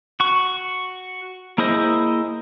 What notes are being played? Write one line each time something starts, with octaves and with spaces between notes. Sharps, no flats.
F#4 C#6
A#3 E4 G#4 C5 D#5